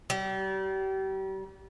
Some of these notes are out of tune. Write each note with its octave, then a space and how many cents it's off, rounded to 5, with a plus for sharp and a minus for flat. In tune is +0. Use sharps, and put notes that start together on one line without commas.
G3 -35